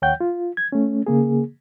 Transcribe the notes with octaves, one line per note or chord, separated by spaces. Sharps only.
D#2 C#5 F#5 G5 G6
F4
G#6
A3 C#4
C#3 A#3 G#4